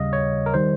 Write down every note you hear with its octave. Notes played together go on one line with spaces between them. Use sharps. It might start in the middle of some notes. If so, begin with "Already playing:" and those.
Already playing: D#2 C#3 G3 D#5 F5
C#5
A#4
D#3 G3 C5